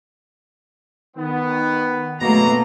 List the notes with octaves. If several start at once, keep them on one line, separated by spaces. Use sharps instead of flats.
D#3 B3
F#1 B2 A3 A#3 A#5